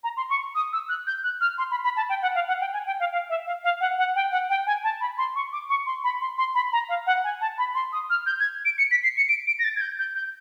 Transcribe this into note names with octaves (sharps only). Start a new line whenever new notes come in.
A#5
C6
C#6
D#6
E6
F#6
G6
F#6
F6
C6
B5
B5
A5
G5
F#5
F5
F#5
G5
G#5
G5
F5
F5
E5
F5
F5
F#5
F#5
G5
F#5
G5
G#5
A5
B5
C6
C#6
D6
C#6
C6
B5
C6
C6
B5
A#5
F5
F#5
G#5
A5
B5
C6
D#6
F6
G6
G#6
D7
C#7
B6
C7
C#7
D7
D7
A#6
A6
G#6
G6
G6
G6